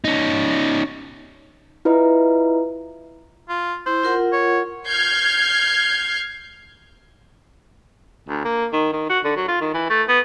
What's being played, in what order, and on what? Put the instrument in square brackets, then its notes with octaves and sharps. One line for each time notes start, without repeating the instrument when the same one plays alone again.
[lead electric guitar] C#4 D#4
[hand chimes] E4 F4 B4 D#5 E5 A#5
[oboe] F4
[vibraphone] E4 [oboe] C5
[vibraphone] F4 A#4 F#5
[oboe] C#5
[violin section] F6 G6 G#6 C7
[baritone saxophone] D2
A#3
D#3
D#3
F#4
D3
F#3
F4
D#3
E3
A3
B3